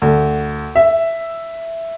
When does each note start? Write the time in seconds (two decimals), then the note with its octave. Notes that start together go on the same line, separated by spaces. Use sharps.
0.02 D2
0.76 E5